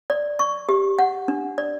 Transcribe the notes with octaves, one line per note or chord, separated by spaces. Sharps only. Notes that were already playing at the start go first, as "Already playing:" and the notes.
D5
C#6
G4
F#5
D4
D5